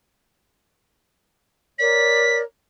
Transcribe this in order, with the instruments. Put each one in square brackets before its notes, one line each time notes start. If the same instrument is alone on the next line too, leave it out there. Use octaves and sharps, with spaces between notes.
[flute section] A#4 C#5 D5 [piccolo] B6